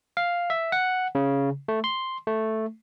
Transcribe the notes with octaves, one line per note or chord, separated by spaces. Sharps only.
F5
E5
F#5
C#3
A3
C6
A3